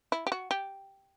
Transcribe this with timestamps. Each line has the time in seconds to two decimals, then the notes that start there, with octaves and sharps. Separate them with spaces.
0.12 E4
0.27 G4
0.32 F#4
0.51 G4